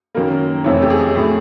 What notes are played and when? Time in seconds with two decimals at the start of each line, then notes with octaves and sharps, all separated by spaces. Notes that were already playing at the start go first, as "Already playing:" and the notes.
0.15 F#2 D#3 F#3 A#3 A#4
0.64 F2 C3 E3 A3 C#5
0.82 G4
0.90 G#4
1.14 A2 F#3 A3